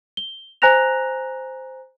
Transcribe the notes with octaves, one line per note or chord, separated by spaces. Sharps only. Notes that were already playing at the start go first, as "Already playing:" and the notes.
G7
C5 G#5 A#5 F#6 A#6 F7